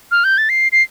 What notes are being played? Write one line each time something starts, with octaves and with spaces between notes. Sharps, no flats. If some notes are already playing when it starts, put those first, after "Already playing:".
F6
G6
A6
C7
C7